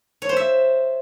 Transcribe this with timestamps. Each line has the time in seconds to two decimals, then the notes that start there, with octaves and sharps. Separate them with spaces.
0.22 C#5
0.29 C5
0.37 E5